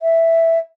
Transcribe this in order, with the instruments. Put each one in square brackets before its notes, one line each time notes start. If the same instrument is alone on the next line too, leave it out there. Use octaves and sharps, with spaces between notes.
[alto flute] E5